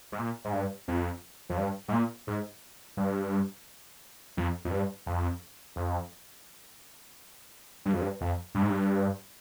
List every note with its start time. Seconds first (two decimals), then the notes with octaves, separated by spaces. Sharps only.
0.12 G#2
0.18 A#2
0.45 G#2
0.53 G2
0.88 F2
1.49 F2
1.58 G2
1.88 G#2
1.92 A#2
2.27 G#2
2.97 G2
4.37 F2
4.65 F2
4.71 G2
5.06 F2
5.76 F2
7.85 G2
7.93 F2
8.01 G2
8.21 F2
8.55 G2
8.62 G#2
8.70 G2